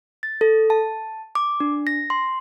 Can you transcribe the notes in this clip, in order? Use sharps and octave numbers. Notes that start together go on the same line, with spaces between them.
A6
A4
A5
D6
D4
A#6
C6